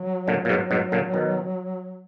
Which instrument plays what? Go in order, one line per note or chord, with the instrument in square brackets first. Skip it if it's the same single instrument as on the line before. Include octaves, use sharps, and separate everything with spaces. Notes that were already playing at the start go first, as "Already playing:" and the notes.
Already playing: [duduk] F#3
[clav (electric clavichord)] A#2 D3
A#2
G#2 B2
G#2 B2
A#2 D3
B2 D#3